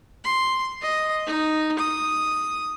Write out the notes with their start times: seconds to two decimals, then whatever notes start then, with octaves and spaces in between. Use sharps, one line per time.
0.25 C6
0.82 D#5
1.27 D#4
1.79 D#6